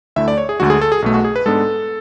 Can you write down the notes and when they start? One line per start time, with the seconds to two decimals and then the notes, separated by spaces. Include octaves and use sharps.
0.16 D2 D3 A3 E4 E5
0.28 D5
0.38 C#5
0.49 G#4
0.60 D2 D3 G#3 F#4
0.70 G#4
0.81 A4
0.92 G#4
1.02 B1 B2 A3
1.14 F#4
1.24 G#4
1.36 B4
1.46 G#2 G#3 B3 D4 A4